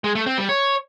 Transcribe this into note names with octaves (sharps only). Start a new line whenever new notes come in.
G#3
A3
C4
G3
C#5